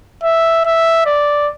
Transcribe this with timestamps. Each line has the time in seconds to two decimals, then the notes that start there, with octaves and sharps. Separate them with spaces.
0.24 E5
0.65 E5
1.06 D5